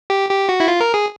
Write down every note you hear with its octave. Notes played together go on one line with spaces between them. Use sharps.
G4
G4
F#4
E4
F4
A#4
G#4